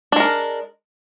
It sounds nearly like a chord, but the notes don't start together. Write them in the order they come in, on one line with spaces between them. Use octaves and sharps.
D4 G#3 A#4